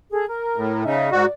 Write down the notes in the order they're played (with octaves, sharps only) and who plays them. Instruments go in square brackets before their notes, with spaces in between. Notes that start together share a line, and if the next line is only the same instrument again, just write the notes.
[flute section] G#4 A4
A#4
[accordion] A2
[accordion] C#3 [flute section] D#4 E5
[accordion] G#2 F#4 [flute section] D5